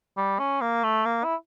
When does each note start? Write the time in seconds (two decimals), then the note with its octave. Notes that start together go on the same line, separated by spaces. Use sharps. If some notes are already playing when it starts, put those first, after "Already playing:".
0.17 G3
0.39 C#4
0.61 A#3
0.84 A3
1.06 A#3
1.24 E4